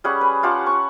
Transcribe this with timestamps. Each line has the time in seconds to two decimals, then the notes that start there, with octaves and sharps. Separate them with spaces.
0.04 G3 C#4 G#4 F#5
0.21 B4
0.43 F4 G4 F#5 A5
0.66 F#5 C#6